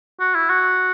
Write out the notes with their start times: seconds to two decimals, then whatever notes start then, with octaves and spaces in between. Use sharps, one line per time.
0.20 F#4
0.35 E4
0.49 F#4